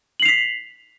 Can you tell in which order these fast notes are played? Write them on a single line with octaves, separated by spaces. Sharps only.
F#7 C7 F7 B6